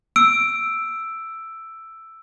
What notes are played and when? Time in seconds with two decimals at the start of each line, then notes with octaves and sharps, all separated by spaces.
0.16 E6 D7